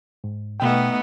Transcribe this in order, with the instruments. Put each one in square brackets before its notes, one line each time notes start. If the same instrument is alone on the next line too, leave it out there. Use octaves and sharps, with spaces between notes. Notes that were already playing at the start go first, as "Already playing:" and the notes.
[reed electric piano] G#2
[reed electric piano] B2 G5 [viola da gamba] A3 B3 D#4